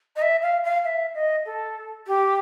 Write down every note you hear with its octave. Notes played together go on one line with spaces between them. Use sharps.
D#5
E5
F5
F5
E5
D#5
A4
G4